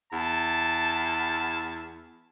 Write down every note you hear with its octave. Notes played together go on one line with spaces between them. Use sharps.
E2 A5